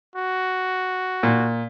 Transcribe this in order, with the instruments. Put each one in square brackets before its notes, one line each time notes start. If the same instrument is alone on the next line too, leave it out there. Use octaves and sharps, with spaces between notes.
[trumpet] F#4
[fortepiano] A#2